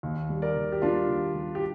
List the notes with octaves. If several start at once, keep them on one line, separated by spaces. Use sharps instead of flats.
D#2
G3
A#4 D5
D#2
G4
G3 D4 F4
D#2
G3
G4